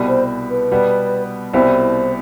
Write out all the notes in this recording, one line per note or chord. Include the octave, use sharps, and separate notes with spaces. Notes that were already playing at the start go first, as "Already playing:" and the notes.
Already playing: C2 B2 G3
C5
B4
B2 G3 B3
C2 B2 G3 C4 E4 C5